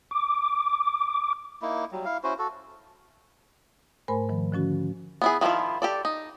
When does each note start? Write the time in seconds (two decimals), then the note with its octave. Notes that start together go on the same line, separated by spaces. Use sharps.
0.11 D6
1.62 A#3 D#4 E4
1.91 F#3 G3
2.05 E4 F5
2.24 C#4 E4 F#4 C5
2.39 F#4 A4
4.08 G#2 A3 A#4 C5 G#5 B5
4.29 D#3 F3
4.52 D3 F3 C#4 F#4
5.22 B3 E4 G#4
5.41 D#3 F3 C#4 E4 F4
5.82 G4 A4 D5
6.05 D#4